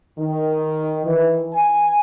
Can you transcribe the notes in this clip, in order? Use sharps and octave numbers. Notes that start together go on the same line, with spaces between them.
D#3
E3
G#5